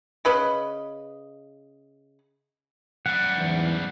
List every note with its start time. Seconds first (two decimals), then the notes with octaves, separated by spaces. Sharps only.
0.25 C#3 B4 D#5
3.06 F#2 G3 F#5
3.36 E2 G#2